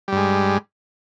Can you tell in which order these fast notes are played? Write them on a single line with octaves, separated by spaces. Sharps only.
G3 G2 G#3